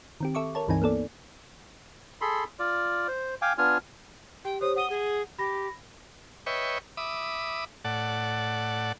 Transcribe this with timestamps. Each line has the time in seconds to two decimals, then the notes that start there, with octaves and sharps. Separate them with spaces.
0.21 D#3 C4 G4
0.35 A4 E5 C#6 D6
0.55 A#4 C#5 A5
0.68 C#2 G2 E3 C4 D#4 G#5
0.82 A#3 B3 A4 D5
2.21 G#4 A4 B5 C6
2.59 F4 D5
3.08 C5
3.42 F5 G5 G#5 D6
3.58 B3 D4 F4 G#5 F6
4.45 G4 G5
4.61 G4 C5 C#5 D#6
4.76 F#5 D#6 D#7 G7
4.90 G#4
5.39 G4 B5 A#6
6.46 B4 C#5 D#5 E5 G5 C#6
6.97 E5 B5 D6 D#6
7.85 A2 D5 F#5 A5